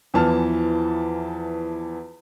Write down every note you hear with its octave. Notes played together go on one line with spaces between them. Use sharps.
E2 E3 F3 A5 F6